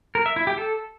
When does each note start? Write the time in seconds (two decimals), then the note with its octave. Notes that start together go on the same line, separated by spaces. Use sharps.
0.15 A#4
0.26 E5
0.36 E4
0.47 G4
0.58 A4